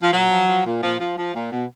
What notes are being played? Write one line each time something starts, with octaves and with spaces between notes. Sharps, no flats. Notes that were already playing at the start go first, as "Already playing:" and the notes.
F3
A#2 F#3
F3
F3
A#2
A#2 F3
F3
F3
A#2
B2